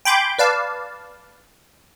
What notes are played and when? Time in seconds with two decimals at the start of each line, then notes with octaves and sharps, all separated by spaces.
0.05 G5 G#5 B5 C6 D6 G6
0.38 B4 D5 F5 A5